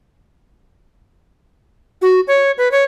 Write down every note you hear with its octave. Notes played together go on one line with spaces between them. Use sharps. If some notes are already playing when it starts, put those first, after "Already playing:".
F#4
C#5
B4
C#5